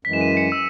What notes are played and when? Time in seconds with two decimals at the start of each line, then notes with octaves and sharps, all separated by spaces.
0.05 F#2 E3 G#3 B6
0.13 E7
0.21 D#7
0.37 C#7
0.52 E6